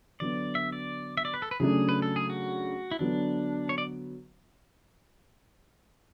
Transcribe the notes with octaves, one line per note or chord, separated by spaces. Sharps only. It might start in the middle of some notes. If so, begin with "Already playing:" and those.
D3 F#3 B3 D5
E5
D5
E5
D5
B4
A4
B4
C#3 F#3 A3 D4 G#4
B4
A4
G#4
F#4
E4
D3 F#3 B3 D4
C#5
D5